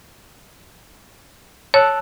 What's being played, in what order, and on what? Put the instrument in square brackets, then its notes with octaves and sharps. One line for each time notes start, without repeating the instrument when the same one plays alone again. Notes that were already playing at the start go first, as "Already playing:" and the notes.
[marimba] C#5 [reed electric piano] A5 E6 F#6